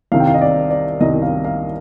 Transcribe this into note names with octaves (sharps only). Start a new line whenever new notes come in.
C2 C3 D#3 F5
G5
F5
D#5
D5
D5
C2 C3 D#3 D#5
F5
F5